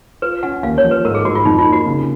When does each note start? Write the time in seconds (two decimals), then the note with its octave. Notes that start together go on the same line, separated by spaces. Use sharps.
0.22 F4 B4
0.43 C#4 F#5
0.63 D#2 F5
0.78 C#5
0.84 F3
0.91 B4
1.05 G#2 A#4
1.15 G#4
1.24 G#2 F#4
1.35 F4
1.45 F2 D#4
1.59 F4
1.66 A#3
1.72 F#4
1.86 C#3